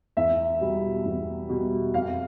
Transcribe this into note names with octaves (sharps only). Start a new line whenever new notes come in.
E2 E5
B2 G3
E2
B2 G3
F2 F5